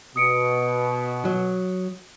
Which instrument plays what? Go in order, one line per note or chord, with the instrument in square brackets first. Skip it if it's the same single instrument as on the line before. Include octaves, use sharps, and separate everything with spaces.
[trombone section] B2 [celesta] D#6 C#7 D7
[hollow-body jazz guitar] F#3